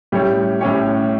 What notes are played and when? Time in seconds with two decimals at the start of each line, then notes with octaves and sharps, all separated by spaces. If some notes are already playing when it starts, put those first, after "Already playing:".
0.12 A2 G3 C#4 G4 C#5
0.61 A2 G3 C#4 G4 C#5